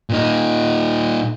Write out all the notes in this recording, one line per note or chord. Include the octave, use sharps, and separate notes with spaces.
A#2 D#4